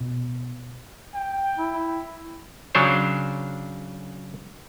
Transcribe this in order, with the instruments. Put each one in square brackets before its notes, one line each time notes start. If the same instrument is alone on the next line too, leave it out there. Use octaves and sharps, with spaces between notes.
[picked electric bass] B2
[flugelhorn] G5
[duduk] E4
[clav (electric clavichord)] C#3 F#3 D4 C5 C#5